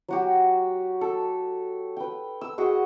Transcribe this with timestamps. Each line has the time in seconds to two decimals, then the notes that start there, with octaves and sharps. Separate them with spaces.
0.08 F#3 F#4 G4
1.01 A4
1.97 B4 G5
2.41 E6
2.58 F#4 G#4 D#5